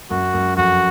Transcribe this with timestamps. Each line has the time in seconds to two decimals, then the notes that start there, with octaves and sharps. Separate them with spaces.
0.10 F#2 F#4
0.34 F#2
0.57 F2 F#4